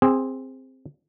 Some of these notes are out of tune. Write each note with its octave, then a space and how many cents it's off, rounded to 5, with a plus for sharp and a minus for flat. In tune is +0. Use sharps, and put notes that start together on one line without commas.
C4 +0 G#4 -20